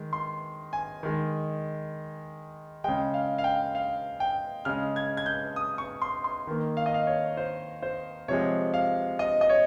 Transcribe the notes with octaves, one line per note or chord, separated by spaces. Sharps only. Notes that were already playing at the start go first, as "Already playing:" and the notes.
Already playing: D#3 G#3
C6
G#5
D#3 G#3
C#3 G#3 G5
F5
F5
G5
F5
G5
C#3 G#3 F6
G#6
G#6
G6
D#6
C#6
C6
C6
D#3 A#3
F5
D#5
F5
C#5
C5
C5
C3 F3 G#3 C#5
F5
D#5
D#5
C#5